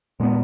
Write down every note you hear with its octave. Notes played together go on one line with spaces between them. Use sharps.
A#2 G#3 B3